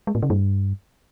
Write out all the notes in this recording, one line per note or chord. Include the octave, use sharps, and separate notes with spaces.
G#3
A2
C#3
G2